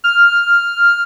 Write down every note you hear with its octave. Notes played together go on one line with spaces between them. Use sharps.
F6